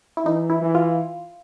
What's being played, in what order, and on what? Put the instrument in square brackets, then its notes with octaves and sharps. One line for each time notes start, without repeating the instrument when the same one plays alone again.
[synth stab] E4
[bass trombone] E3 [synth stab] D#4
[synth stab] E4
[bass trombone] E3
[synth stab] F4